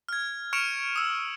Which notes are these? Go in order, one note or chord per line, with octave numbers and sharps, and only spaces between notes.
F6 G#6
C#6 F6 C#7 D7 E7 F7
D#6 E6